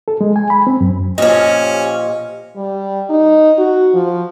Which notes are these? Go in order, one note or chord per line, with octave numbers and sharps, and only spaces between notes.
A4
G#3
G#5
B5
C4
F#2
A#2 F3 C#4 G4 D#5
G3
D#4
F#4
F3